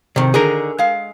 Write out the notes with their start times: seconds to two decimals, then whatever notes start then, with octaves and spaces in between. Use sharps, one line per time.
0.16 C3 D#3
0.34 D3 D#3 G#4 A#4
0.78 G#3 F5